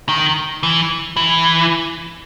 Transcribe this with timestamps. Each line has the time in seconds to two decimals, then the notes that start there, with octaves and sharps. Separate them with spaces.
0.09 D#3
0.63 E3
1.17 E3